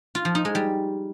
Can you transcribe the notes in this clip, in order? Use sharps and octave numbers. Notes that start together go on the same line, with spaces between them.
F4
F3
D#4
G#3
G3